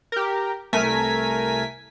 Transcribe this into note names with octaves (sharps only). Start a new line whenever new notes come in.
G4 A#4
C2 A3 A#4 G#5 B6